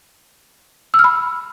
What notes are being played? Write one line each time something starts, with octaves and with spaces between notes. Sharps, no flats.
E6
F6
B5